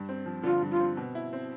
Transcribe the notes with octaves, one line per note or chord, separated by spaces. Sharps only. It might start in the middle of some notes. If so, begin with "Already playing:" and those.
Already playing: G2
C4
F3
D3 F4
G2
F4
C4
B2
E4
C4